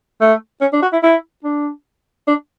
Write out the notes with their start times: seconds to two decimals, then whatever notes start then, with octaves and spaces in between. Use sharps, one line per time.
0.21 A3
0.61 C#4
0.72 D4
0.82 F#4
0.93 E4
1.03 E4
1.44 D4
2.27 D4